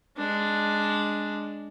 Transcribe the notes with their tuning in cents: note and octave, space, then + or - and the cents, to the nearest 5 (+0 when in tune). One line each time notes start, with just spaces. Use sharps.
G#3 +0 D4 +0